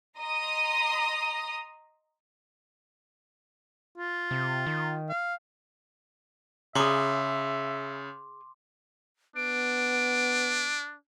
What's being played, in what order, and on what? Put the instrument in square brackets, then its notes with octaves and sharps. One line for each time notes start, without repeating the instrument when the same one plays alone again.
[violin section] D#5 A#5 C6 D#6
[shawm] F4
[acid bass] C3
D#3
[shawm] F5
[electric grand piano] C#3 [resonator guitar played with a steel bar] G#4 A#5 [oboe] E5 [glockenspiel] C6 D6
[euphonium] B3 [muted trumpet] D4 [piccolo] D7